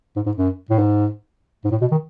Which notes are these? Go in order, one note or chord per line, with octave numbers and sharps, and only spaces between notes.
G#2
G#2
F#2
A2
G#2
G#2
A2
B2
D#3